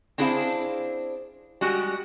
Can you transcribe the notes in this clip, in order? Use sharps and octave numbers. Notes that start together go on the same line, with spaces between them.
C4 D4 E4 G#4 C5 F5
G3 G#3 F#4